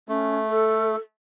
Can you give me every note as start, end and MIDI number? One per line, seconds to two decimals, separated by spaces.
0.09 0.96 57
0.09 0.38 61
0.49 0.97 69